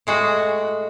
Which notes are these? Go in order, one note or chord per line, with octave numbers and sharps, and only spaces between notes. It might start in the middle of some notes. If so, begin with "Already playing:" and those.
A2 G#3 F#4